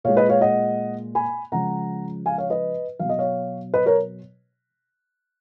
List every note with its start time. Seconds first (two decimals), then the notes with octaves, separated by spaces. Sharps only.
0.04 A#2 G#3 C#5 F5
0.17 B4 D#5
0.29 C#5 F5
0.41 D#5 F#5
1.15 G#5 B5
1.52 C#3 F3 G#3 F#5 A#5
2.26 F5 G#5
2.38 C#5 F5
2.50 B4 D#5
2.99 B2 F#3 F5
3.09 D#5
3.19 C#5 F5
3.74 B4 D#5
3.86 A#4 C#5